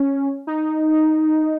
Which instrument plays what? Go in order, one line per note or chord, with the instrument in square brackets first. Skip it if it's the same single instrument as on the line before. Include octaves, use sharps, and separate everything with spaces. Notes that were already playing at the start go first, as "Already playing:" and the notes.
Already playing: [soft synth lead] C#4
D#4